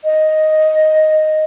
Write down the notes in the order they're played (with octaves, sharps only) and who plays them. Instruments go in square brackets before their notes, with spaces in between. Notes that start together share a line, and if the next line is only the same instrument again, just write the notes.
[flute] D#5